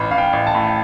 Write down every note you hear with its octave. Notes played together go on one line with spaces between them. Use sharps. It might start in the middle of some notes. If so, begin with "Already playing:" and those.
Already playing: A1 B5
A1 F5
G5
A1
A5
A2